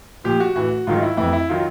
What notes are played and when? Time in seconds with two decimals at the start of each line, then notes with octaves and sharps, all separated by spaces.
0.24 A#2 F3 G4
0.40 F#4
0.55 A2 E3 F#4
0.87 G#2 D#3 F#3 F4
1.02 E4
1.17 F2 C3 E3 E4
1.33 E4
1.49 D#3 F#3 F4